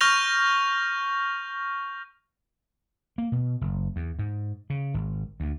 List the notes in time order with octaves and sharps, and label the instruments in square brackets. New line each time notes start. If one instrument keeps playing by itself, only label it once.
[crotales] C#6 F6 G6 A#6 F7
[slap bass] A#3
B2
F#1
E2
G#2
C#3
G#1
D2